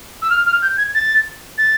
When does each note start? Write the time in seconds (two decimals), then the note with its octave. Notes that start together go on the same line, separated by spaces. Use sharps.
0.22 E6
0.29 F6
0.46 F6
0.62 G6
0.77 G#6
0.94 A6
1.57 A6